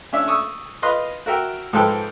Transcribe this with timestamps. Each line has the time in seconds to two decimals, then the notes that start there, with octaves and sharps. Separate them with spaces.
0.13 C#4 D4 E5
0.28 C#6 D#6 E6
0.82 F4 B4 D#5 C6 D#6
1.26 F#4 A#4 E5 G5
1.73 G#2 F3 G#3 A4 B4 G5